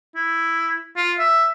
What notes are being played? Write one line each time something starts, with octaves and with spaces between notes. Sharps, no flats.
E4
F4
E5